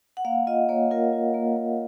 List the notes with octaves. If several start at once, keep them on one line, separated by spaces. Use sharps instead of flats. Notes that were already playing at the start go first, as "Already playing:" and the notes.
F#5
A#3 F5
F4 D#5
A#3 C#5
F4 A#4
F4
A#3
A#3